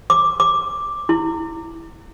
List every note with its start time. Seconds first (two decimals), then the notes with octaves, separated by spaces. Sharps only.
0.10 D6
0.40 D6
1.09 E4